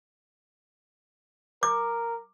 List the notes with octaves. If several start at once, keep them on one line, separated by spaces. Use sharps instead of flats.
A#4 D6